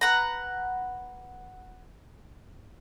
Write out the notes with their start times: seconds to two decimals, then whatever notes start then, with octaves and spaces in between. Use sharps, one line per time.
0.01 B4 F#5 A#5